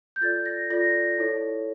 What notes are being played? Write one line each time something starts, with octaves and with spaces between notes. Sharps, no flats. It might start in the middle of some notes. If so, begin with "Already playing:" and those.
G6
F4 A4 D5 A6
A#6
F4 A4 D5 A#6
E4 A4 C#5